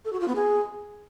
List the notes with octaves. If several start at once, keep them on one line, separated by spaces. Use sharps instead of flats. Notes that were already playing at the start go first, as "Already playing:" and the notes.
A4
F#4
F4
B3
G#4